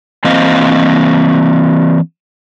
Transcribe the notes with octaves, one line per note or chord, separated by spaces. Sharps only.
E3 A#3 C4 C5 D#5 F5